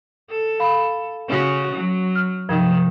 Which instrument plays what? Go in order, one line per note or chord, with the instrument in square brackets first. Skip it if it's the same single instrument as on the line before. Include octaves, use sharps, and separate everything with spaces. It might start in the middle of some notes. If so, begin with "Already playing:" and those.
[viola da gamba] A4
[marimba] F5 B5
[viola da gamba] C#3 C#4 F#4
F#3
[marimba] F6
[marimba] G2 C3 F3 [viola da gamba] D#3